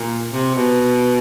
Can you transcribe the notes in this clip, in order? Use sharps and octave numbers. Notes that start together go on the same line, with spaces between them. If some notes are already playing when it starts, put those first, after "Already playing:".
Already playing: A#2
C3
B2